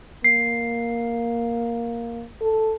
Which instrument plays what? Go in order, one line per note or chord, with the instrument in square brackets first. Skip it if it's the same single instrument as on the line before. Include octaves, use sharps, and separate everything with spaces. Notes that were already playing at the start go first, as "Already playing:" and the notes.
[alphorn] A#3 [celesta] C7
[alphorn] A4